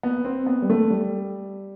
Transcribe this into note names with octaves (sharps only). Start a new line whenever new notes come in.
B3
C4
B3
G3
A3
G3